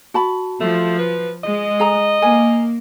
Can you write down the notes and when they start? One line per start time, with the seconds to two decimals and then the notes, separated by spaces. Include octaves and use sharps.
0.14 F#4 A5 B5
0.61 F3 A3
0.99 B4
1.44 G#3 D#5
1.80 G#4 A#5
2.22 A#3 A#4 G#5